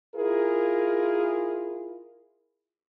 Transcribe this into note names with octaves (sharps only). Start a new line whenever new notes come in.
E4 F4 G#4 A#4